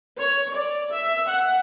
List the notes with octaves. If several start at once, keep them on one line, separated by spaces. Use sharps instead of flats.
C#5
D5
E5
F#5